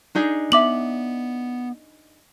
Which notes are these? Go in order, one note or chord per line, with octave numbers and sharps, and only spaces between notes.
D4 D#4 G#4
B3 E5 D6 F#7